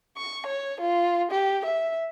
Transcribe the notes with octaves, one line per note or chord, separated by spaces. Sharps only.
C#6
C#5
F4
G4
E5